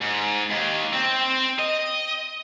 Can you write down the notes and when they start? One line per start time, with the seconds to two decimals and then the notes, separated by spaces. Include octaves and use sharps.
0.01 G#2
0.50 D#2
0.93 C4
1.59 D#5